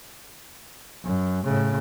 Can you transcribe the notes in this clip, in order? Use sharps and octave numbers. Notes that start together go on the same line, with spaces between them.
F#2
A2 C#3